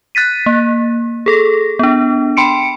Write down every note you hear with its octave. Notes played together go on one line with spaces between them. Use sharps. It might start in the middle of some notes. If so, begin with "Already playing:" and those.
F#6 A6 B6 D#7
A#3
G#4 A4 A#6
B3 D4
G5 B5 C6 C#7 D7